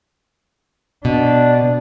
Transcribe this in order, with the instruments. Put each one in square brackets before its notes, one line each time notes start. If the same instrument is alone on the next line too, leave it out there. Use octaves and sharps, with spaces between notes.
[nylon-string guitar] B2 [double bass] D4